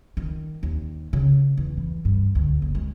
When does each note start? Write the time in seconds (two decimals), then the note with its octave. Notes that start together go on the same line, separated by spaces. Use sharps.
0.17 D#3
0.63 D#2
1.13 C#3
1.57 E2
1.77 E3
2.05 G2
2.35 D2
2.62 F#1
2.75 G#3